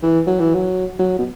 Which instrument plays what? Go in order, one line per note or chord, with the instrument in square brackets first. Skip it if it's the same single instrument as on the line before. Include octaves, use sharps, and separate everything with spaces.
[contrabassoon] E3
F#3
E3
F#3
F#3
B2